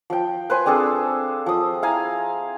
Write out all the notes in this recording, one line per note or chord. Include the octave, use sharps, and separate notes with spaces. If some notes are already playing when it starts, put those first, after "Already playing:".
F3 G5
B4 C5 G#5
C4 D4 G#4 A4
F3 D#6
E4 F5 G#5 A#5